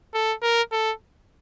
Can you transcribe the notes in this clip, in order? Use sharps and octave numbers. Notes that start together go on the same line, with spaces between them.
A4
A#4
A4